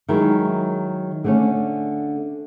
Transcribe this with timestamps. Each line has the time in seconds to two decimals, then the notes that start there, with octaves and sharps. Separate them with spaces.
0.09 D#3 F#3 G#3 E4
1.24 D3 A3 C#4